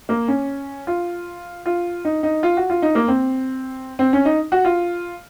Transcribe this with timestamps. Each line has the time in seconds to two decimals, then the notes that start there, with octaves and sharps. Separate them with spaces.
0.09 A#3
0.28 C#4
0.87 F4
1.66 F4
2.05 D#4
2.23 D#4
2.43 F4
2.57 F#4
2.70 F4
2.82 D#4
2.95 A#3
3.08 C4
3.99 C4
4.13 C#4
4.25 D#4
4.52 F#4
4.65 F4